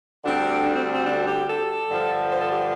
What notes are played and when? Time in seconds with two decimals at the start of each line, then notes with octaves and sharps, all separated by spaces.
0.24 D2 D3 G3 C4 D4
0.66 D4
0.75 C4
0.95 C4
1.07 D4
1.28 G4
1.49 A4
1.90 G2 D3 F3
2.32 C5
2.42 A4
2.51 G4